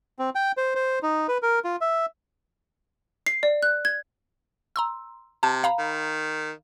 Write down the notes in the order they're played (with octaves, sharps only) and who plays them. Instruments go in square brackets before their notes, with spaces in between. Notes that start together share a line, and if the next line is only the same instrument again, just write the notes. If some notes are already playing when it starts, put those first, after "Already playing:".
[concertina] C4
G5
C5
C5
D#4
B4
A#4
F4
E5
[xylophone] C7
D5
F#6
G#6
[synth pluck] A#5 C6 E6
[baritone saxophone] C3 [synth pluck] A5
[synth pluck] F5 A#5 B5
[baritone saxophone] D#3